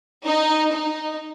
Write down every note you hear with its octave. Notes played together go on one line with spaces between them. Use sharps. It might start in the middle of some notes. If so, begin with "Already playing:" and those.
D#4
D#4